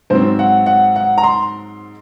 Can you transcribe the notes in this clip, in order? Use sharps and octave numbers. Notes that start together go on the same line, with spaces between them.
G#2 F#3 C4 C5
F#5
F#5
F#5
A#5
C6